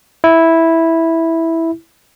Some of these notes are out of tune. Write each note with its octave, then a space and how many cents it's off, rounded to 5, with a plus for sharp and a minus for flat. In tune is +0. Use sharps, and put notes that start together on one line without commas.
E4 -5